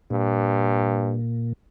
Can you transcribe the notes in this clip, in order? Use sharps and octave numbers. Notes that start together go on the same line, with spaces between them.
G2 A#2